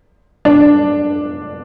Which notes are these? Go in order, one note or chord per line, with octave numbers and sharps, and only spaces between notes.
D4